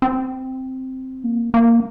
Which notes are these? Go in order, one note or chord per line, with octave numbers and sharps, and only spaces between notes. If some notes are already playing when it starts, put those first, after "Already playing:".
C4
A#3
A#3